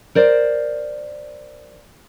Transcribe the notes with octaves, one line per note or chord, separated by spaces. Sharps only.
A#4 C5 D5